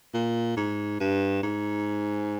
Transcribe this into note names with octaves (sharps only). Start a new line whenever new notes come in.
A#2
G#2
G2
G#2